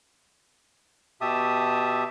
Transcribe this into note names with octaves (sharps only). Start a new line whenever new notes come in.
B2 G4 E5 A5 D#6